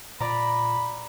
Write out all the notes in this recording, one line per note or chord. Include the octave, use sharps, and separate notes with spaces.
A#2 D5 A#5 B5